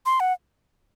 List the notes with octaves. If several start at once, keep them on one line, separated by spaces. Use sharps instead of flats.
C6
F#5